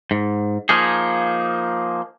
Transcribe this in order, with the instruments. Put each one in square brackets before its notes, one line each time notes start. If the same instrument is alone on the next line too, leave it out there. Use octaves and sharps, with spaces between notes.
[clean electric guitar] G#2
F3 A#3 D#4 G#4